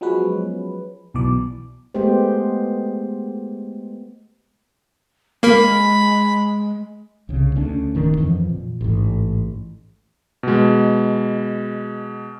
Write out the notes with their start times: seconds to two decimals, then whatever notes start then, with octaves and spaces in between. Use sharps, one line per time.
0.01 F3 F#3 G#3 B3 C#4 B4
1.14 B1 B2 E3 D5
1.94 G#3 A3 B3 G4 C5
5.43 G#3 A#3 A#4 B5
7.29 C2 C#3
7.55 D2 C#4 D4
7.95 D1 D#3 C#4 D4
8.18 F2 E3 F3
8.49 A#2
8.81 A1 G#2
10.43 B2 G#3